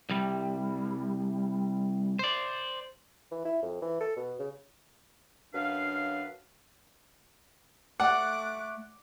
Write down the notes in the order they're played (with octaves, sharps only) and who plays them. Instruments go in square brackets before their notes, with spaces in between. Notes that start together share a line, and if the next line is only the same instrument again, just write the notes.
[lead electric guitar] C2 G3
C5 D5
[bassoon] E3
E4
F2
E3
A4
B2
C#3
[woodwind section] F#2 F#3 D4 B4 F5
[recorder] A3 [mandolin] D5 [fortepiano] F#5 [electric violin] D6 F#6